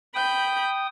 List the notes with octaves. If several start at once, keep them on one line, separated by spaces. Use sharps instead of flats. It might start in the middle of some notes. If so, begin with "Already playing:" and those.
G5 B5 D#6 G6